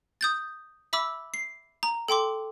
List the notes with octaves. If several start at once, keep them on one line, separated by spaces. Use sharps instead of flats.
D#6 G6 A6
E5 B5 D6 E6
C7
A#5
A4 G5 C6 D6